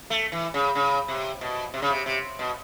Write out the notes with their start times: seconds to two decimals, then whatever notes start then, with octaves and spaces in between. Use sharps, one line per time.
0.10 A3
0.32 E3
0.54 C#3
0.75 C#3
1.08 C3
1.41 B2
1.74 C3
1.82 C#3
1.90 C3
2.06 C3
2.39 B2